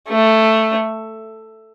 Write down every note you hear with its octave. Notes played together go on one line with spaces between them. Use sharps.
A3